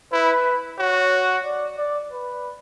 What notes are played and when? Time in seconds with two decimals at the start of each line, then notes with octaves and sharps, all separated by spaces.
0.12 E4 B4
0.79 F#4 C#5
1.45 D5
1.78 D5
2.12 B4